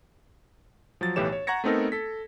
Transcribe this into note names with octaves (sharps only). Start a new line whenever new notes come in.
F3 F#3 A6
B1 A2 E3 G4 C#5 E7
C#5
F#5 A#5 C#6 G#6 A#6 C#7
A3 B3 C4 D#4 A4 A#4
A4 B6